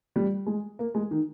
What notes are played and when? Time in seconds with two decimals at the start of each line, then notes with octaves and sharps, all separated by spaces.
0.16 G3
0.46 G#3
0.79 A#3
0.95 G#3
1.11 D#3